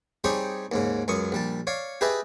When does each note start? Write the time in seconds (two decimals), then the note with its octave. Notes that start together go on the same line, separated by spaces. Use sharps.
0.24 G3 C4 D#4 G4 G#4 C#5
0.72 D#2 G#2 C#3
1.08 C#2 F#2 C#6 D#6
1.32 A#1 G3 A5
1.67 C#5 D5 F5
2.01 G4 G#4 B4 D#5 E5 A5